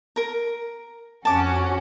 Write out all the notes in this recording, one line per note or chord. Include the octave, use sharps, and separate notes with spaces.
A#4 A#5
F2 C#4 F#4 A5 D6